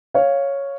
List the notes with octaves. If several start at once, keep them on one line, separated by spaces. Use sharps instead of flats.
C#5 F5